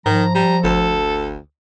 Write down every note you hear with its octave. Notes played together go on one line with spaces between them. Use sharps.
G#2 D#3 F3 A#5
G3 A#5
G1 D2 A4